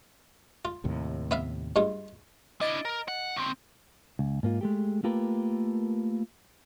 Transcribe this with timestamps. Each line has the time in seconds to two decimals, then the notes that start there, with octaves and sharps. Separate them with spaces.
0.65 F4
0.84 D#2 A2 C3
1.31 B3 E5 F5
1.76 G2 G#3 F4
2.61 D4 E4 D#5 A6 D7
2.85 A#4
3.08 F#5
3.36 D#2 C4
4.19 C#2
4.43 G#2 A#3 F4
4.61 G#3 A3 G4
5.04 A3 A#3 F4 G4 A#4 B4